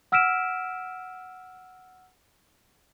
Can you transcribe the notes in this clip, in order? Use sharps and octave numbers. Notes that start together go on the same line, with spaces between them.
F#5 E6 F6 B6 D7 E7